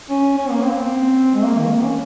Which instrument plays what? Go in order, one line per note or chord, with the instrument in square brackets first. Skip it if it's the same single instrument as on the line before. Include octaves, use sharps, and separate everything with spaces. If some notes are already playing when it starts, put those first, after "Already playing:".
[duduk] C#4
C#4
A#3
C4
A#3
C4
G#3
A#3
D#3
G#3
A#3
C#4